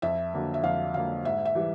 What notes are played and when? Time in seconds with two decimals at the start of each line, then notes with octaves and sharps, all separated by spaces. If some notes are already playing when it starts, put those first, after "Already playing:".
0.02 F2 E5
0.34 D3 F#3 A#3
0.54 E5
0.63 F2 F5
0.94 D3 F#3 A#3 F5
1.25 G#2 E5
1.45 E5
1.55 E3 G3